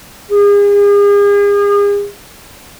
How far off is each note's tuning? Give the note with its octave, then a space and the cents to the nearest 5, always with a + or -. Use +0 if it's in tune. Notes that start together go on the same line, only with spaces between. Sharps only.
G#4 -40